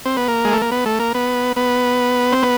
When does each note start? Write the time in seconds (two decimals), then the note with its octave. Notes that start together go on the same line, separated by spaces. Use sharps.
0.06 C4
0.17 B3
0.28 A#3
0.45 G#3
0.53 A3
0.62 A#3
0.72 B3
0.86 A3
1.00 A#3
1.15 B3
1.56 B3
2.32 C4
2.43 B3